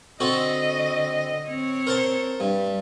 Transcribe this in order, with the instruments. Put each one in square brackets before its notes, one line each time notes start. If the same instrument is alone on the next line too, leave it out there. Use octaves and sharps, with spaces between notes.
[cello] D3 D#5 [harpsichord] C4 F#4 A4
[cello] C4 C#5
[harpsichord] A#4 C5 A5
[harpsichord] G2 [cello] G3